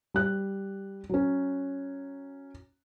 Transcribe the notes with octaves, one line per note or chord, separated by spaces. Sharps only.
G3 F#6
F#3 C#4